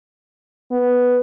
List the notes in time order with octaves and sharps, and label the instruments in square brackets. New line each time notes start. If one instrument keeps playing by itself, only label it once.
[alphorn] B3